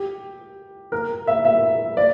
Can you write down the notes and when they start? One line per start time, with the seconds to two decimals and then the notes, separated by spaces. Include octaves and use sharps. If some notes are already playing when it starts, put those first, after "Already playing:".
Already playing: G4
0.92 A#4
1.27 E5
1.45 E5
1.97 D5